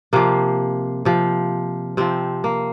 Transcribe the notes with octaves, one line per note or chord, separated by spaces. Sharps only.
C3 F3 A#3
C3 F3
C3 F3 C4
A#3